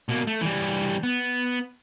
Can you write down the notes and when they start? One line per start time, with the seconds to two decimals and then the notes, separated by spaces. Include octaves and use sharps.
0.09 B2 A#3
0.27 A3
0.41 E3 G3
1.03 B3